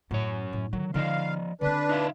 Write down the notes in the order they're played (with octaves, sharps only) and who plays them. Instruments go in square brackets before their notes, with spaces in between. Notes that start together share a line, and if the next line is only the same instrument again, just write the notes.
[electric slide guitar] F#2 C#5 [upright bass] A2
[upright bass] A2
[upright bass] D3 D#3 [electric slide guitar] F#3
[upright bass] D3 D#4 [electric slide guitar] F3 D5 D#5 [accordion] F5
[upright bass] D3 C4 [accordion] D4 B4
[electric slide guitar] D#4 E5 F5